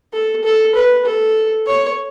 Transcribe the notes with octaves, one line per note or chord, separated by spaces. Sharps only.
A4
A4
B4
A4
C#5